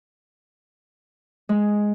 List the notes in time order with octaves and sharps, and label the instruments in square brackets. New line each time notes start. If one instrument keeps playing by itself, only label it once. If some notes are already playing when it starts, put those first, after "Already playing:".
[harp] G#3